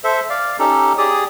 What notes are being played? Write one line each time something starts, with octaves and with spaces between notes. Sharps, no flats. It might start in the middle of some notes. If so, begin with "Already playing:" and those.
A4 C5 E5
D5 F5
C#4 D#4 G4 A4
G4 G#4 D5 D#6